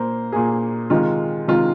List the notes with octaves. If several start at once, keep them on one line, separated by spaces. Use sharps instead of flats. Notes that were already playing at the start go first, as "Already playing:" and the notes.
Already playing: A#2 A#3 C5
A#2 A#3 G#4
C3 D#3 G#3 F4
C3 D#3 G#3 F4